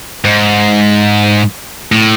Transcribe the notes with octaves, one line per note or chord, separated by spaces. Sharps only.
G#2
A2